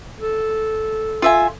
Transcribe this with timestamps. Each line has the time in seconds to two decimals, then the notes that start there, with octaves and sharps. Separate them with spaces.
0.20 A4
1.22 F4 E5 G#5